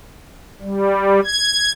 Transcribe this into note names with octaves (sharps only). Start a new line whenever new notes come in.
G3
G#6